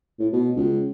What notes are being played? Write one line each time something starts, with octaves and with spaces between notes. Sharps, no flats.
A2
B2
C#2